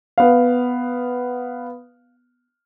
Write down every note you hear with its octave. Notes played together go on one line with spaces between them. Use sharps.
B3 F5